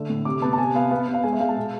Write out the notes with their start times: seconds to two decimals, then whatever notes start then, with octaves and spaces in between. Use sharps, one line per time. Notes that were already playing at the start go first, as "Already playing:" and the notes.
Already playing: D3 A3 E6
0.09 A2
0.25 C3 D6
0.42 B3 A5
0.53 A5
0.58 C3 G#5
0.75 B3 F5
0.91 B3 F5
1.08 B3
1.14 F5
1.23 G#3 G#5
1.33 E5
1.40 G#3 F5
1.48 A5
1.56 B2